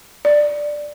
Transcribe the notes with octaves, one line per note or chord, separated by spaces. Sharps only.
D5